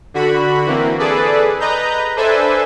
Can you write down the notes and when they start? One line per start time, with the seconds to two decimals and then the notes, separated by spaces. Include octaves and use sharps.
0.14 D3 F#4 B5
0.66 E3 A#3 C4
0.99 G#4 A4 B4 D5
1.60 B4 D#5 A#5 G6
2.16 D4 A4 B4 C5 E5 G#5